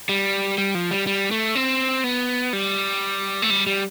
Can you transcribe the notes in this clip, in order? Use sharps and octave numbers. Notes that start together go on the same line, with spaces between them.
G3
G3
F3
G3
G3
A3
C4
B3
G3
A3
G3
G3